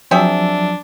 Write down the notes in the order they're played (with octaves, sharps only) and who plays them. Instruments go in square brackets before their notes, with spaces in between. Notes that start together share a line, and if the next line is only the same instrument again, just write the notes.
[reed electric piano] F3 F#3 [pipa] C4 G#4 E5 [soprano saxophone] D4